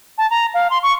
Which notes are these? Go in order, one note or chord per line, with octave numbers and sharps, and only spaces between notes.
A5
A#5
F5
C6
C#6